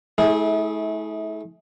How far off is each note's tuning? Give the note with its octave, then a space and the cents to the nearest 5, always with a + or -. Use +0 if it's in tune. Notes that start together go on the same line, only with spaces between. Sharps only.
A3 -30 E4 -35 G#4 +0